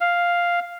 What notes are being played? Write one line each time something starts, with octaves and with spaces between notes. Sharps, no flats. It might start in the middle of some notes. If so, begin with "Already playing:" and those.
F5